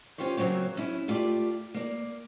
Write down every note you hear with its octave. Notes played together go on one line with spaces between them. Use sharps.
C#4 F4 G4 C5 C#5
C#3 F#3 A#3 C4 C#5
C#4 E4
A3 F4 G4 D5
A#3 D5